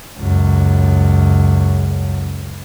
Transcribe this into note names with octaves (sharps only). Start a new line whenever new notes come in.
C#2 F#2